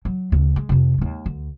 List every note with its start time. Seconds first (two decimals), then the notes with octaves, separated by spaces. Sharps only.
0.05 F#3
0.32 D2 C#3
0.56 G#3
0.69 F2 C3
0.98 D#2 G#3
1.26 D2